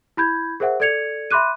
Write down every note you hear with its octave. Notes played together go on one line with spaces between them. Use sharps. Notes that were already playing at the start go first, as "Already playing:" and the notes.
E4 B5 G6 G#6
G#4 A#4 C5 E5 F#5
A4 D5 G#6 C#7 F7
E5 B5 C6 D6 F#6 D#7